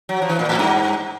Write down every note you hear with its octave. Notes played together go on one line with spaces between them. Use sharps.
F#3
F3
E3
A#2
A2
G2